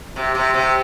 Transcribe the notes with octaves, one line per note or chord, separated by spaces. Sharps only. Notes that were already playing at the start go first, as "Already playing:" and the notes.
C3 G4
C3
C3